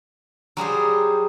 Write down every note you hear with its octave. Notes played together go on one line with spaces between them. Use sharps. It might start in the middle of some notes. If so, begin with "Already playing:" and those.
F#3 G3 G#4 C5